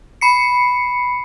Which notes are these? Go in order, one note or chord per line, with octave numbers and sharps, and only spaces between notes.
B5 C7 C#7